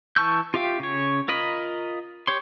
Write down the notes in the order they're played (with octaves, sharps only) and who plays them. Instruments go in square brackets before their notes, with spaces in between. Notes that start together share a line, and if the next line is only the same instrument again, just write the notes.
[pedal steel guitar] E3 A5 C#6 E6 G6
F4 G4 E5 F5 G5
C#3 C#5
F4 A#4 D#5 B5
G4 C#5 C6